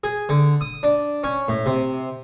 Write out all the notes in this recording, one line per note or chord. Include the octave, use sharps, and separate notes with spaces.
G#4
D3
D#6
D4
C#4
A2
C3